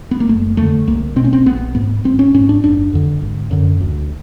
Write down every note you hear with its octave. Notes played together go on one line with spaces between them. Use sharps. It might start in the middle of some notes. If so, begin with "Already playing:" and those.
B3
A#3
F#1 A3
F2 D3 A3
C2 A#3
B2 C4
C#4
C4
A#1 B3
G#2 B3
G#1 C4
C#4
G#2 C#4
D4
F#1 D4
F2 D3
G#1
F#2 D3
D2